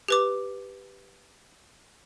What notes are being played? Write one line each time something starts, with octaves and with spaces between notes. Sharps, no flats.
G4 B4 D6